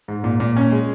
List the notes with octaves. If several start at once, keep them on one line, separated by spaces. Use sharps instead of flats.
G#2
A#2
A#2
C#4
G#3